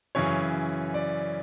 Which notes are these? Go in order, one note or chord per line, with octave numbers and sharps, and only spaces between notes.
F#2 C#3 E3 C#5
D5